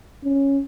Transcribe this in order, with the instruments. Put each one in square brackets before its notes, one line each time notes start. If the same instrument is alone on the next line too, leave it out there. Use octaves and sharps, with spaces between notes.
[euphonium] C#4